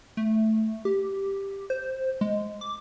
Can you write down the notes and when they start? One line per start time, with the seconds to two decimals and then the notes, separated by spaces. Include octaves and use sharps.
0.17 A3
0.85 G4
1.70 C5
2.21 G#3
2.61 D6